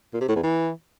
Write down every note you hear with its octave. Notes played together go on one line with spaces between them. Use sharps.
A#2
C3
A2
E2
E3